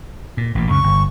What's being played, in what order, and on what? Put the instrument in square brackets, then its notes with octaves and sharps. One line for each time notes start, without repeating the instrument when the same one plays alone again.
[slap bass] A#2
A1 A#2
[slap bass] C#2 F#2 [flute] C#6
[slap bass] G1